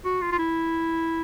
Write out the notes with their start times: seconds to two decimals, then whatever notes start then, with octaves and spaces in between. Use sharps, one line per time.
0.05 F#4
0.22 F4
0.32 F4
0.39 E4